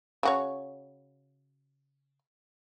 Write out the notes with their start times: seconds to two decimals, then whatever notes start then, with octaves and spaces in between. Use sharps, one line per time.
0.23 C#3 F#4 C#5